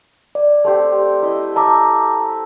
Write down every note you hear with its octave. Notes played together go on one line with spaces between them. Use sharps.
D5
A3 C4 G4
E4 D#5
E5 A5 A#5 D6